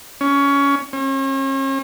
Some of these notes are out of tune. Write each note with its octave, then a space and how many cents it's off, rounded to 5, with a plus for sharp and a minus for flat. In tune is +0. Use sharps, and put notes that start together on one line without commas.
C#4 +20
C#4 -40